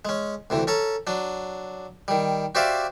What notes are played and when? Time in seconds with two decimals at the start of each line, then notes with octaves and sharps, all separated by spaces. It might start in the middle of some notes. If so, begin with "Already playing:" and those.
0.05 G#3 C#4
0.50 D2 C3 E3
0.67 C#4 A4 A#5
1.07 F#3 D4
2.08 D#3 G3
2.55 F#4 G4 C5 D5 E5 F5